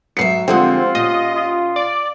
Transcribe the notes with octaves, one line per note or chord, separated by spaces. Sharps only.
G#2 F#3 B4 E5 C7 C#7
D3 F3 G#3 C4 F4 G4 F#5
A#2 C#4 D#5
F4
D5